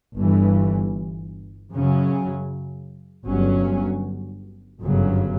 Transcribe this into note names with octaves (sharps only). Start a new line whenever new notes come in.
G1 G2 E3
F#2 C#3 F#3 C#4
G1 G2 F#3 C#4
G1 F#2 C#3 F#3